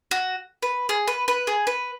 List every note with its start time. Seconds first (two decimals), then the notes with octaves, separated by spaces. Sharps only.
0.11 F#4
0.62 B4
0.89 G#4
1.08 B4
1.28 B4
1.47 G#4
1.67 B4